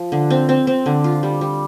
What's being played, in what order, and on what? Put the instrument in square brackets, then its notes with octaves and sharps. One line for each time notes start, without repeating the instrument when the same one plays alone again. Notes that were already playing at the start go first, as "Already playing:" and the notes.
Already playing: [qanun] F3
D3
C4
C4
C4
D3
F4
G3
G3